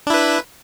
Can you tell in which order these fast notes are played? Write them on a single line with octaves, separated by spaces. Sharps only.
D4 E4 B4